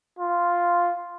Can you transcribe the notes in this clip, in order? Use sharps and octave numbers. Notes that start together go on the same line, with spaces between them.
F4